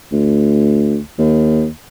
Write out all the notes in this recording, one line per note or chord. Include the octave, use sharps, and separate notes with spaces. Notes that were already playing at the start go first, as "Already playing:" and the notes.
D2
D#2